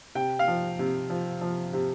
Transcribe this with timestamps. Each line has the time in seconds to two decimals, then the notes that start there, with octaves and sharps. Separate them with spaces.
0.15 C3 G5
0.39 F5
0.48 F3
0.79 C3
1.10 F3
1.41 F3
1.73 C3